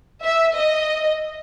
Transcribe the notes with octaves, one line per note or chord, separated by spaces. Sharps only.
E5
D#5